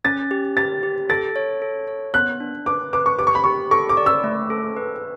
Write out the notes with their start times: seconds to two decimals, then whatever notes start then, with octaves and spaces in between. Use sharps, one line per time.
0.04 C#4 A6
0.31 G4
0.57 G4 A6
0.83 G4
1.09 A4 A6
1.36 C#5
1.62 A4
1.88 C#5
2.14 B3 F#6
2.40 D4
2.66 B4 D6
2.93 B4 D6
3.06 C#6
3.19 G4 D6
3.27 C#6
3.35 B5
3.44 G4 C#6
3.71 A4 C#6
3.89 D6
3.97 D5
4.06 E6
4.24 A3
4.50 A4
4.77 B4